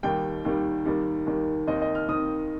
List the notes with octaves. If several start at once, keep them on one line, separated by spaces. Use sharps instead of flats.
D#2 D#3 G3 G5
D#2 D#3 G3
D#2 D#3 G3
D#2 D#3 G3
D#2 D#3 C4 D#5
D#5
F6
D#2 D#3 C4 D#6